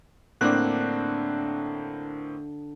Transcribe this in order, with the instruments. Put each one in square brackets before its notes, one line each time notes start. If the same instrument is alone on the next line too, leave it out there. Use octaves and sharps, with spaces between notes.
[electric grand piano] A2 A#3 C4 [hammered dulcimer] D3 [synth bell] D4 F#6